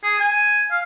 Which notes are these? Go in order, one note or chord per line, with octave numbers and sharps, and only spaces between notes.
G#4
G#5
F5